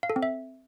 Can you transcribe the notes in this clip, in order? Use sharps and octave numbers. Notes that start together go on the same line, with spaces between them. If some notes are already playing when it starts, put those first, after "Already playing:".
F5
A4
C4
E5